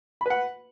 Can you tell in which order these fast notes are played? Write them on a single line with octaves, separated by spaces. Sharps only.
B5 B4 F#5